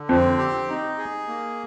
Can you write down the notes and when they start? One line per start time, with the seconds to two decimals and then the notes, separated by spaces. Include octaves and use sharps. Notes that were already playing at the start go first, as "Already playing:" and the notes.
Already playing: D3
0.09 F2 C4
0.38 G4
0.69 D#4
0.98 G#4
1.27 A#3